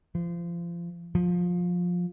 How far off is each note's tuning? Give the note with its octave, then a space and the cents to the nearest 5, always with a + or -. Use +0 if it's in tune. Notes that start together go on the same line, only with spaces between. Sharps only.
F3 -30
F3 +20